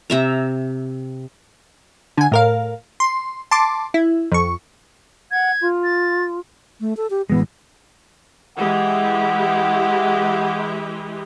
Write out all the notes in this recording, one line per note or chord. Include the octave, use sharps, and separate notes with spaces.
C3 E5 A#5
D3 G#5
A2 A#4 F5
C6
A5 C6 D6
E4
F2 C#6
F#5 G#6
F4
A6
A3
A4
G4
A1 E3 G#3 B3
E3 G#3 G4 F#5